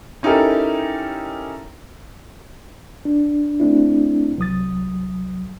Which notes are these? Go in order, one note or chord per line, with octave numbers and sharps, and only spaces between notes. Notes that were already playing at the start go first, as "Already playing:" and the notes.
C#4 D#4 E4 G4 A4 A#4
D4
A3 C4 D4 E4
C2 F#3 D#6 A6